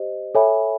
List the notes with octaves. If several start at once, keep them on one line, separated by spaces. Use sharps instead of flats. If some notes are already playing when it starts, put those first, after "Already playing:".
Already playing: G4 C5 D#5
A4 C#5 E5 G#5 B5